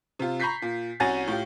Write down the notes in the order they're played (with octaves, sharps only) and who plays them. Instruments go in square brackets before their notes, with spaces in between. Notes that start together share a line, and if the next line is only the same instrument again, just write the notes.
[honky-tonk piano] C3 F4
A#5 B5 C#6 G6 B6 C7
A#2
C2 C#4 F#4 G#5 A6 A#6
A2 F4 G4